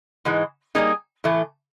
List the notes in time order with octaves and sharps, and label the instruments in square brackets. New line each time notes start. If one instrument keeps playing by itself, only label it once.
[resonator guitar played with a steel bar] G#2 E3 G#3
G3 A#3 D#4 G#4
A2 E3 A3